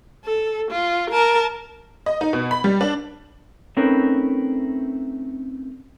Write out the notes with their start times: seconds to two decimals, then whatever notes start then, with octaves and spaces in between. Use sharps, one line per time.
0.25 A4
0.71 F4
1.11 A#4 A5
2.06 D#5
2.21 D#4
2.33 B2
2.51 B5
2.64 G3
2.81 D4
3.77 A3 C4 C#4 D#4 A#4 B4